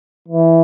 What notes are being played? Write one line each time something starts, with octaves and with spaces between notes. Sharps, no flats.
E3